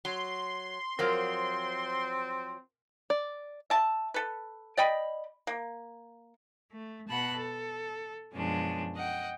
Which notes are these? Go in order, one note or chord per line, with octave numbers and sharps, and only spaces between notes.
F#3 C6
F3 F#3 C4 A#4 F6
D5
E5 A5
A4 B4
D5 D#5 G5 B5
A#3
A3
B2 F#5 A5 B5 F#6
A4
F#2 B2 F3 G#3 C#4 D4
D#5 F#5 G5